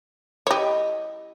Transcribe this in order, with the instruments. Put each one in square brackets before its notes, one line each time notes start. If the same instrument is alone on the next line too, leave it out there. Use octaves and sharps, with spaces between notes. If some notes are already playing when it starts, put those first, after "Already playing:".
[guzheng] E4 D#5 [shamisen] G4 C#5